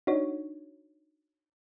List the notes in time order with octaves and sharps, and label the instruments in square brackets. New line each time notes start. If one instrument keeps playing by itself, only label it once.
[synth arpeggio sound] D4 D#4 F#4 C#5